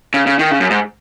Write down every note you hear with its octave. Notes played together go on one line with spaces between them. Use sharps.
C#3
C#3
D#3
C#3
F#2
G#2